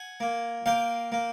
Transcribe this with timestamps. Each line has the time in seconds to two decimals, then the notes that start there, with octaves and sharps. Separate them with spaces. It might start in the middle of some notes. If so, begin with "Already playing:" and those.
Already playing: F#5 G#5
0.20 A#3
0.66 A#3 F5 G5
1.12 A#3